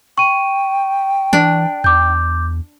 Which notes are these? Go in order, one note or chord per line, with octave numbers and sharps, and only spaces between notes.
G5 C#6 D#7
E3 D4
E2 D6 G6